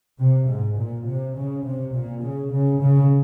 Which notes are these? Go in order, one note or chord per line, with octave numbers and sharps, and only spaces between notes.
C3
G#2
A#2
C3
C#3
C3
A#2
C#3
C#3
C#3